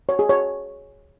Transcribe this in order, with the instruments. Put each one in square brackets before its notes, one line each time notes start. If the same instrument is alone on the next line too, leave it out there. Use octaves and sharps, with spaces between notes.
[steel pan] C#5
G#4
C#5